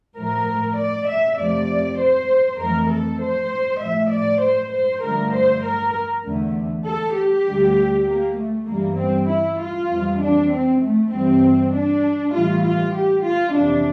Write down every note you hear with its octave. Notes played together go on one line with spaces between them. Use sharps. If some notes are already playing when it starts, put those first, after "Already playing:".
A2 F3 A3 A#4
D5
E5
F2 C3 F3 A3 D5
C5
F2 E3 A3 A#4
A4
C5
A2 F3 A3 E5
D5
C5
C5
G2 D3 F3 A3 A#4
C5
A#4
E2 D3 A3
A4
G4
D2 D3 G3
A#3
A3
G2 E3 G3 A#3
C4
E4
F4
F2 E3 G3
D4
C4
A3
G2 E3 G3 C4
D4
A2 E3 G3 F4
F4
G4
F4
F2 C3 E3 D4